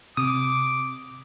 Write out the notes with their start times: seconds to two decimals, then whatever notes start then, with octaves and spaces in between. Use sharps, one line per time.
0.17 C3 D6 D#6